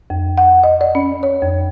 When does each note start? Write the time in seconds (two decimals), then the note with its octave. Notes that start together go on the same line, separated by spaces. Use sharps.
0.10 F2
0.38 F#5
0.64 D#5
0.81 D5
0.95 C#4
1.23 C#5
1.42 F2